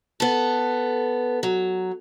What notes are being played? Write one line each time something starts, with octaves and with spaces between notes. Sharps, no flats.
B3 A4
F#3